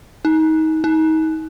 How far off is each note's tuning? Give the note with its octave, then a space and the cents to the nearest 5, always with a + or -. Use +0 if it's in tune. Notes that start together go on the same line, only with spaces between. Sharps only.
D#4 +25
D#4 +35